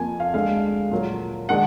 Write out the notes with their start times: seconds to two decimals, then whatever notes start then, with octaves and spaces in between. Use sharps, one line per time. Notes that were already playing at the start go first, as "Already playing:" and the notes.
Already playing: F2 F3 A#3 G#5
0.20 F5
0.34 D2 D3 G#3 F5
0.91 A#2 F#3 A#3
1.49 D#3 G#3 D4 F#5